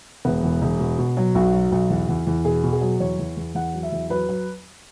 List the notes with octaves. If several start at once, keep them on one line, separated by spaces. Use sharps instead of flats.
E1 B3
E2
E1
B2
B2
F#3
B1 F#4
F#3
B1
E2
E2
E2
B2 G#4
B2
G#4
F#3
E2 C#5
E2
E2
E2 F#5
F#3
E5
E2
F#3 B4
F#3